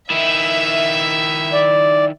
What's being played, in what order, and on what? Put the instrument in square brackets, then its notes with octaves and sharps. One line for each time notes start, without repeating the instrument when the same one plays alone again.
[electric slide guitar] D#3 E4 [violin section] E5
[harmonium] D5